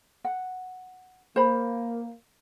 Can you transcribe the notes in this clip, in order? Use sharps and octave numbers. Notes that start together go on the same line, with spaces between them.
F#5
A#3 C5 B5